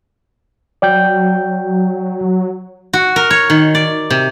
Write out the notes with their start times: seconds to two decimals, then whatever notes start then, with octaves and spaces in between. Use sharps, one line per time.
0.82 F#3 D5 G5 G6
2.93 F#4
3.16 A#4
3.31 C#5
3.50 D#3
3.75 D5
4.10 C3